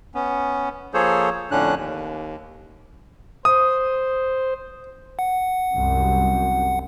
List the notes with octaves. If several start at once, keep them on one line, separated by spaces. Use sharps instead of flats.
B3 C#4
F3 A#3 G#4 A4 C5 C#5
F2 A2 D3 C#4 D4 F#6
D#2
C5 D#6
F#5
C2 F#2